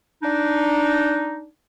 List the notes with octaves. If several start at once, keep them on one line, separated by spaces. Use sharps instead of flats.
D4 D#4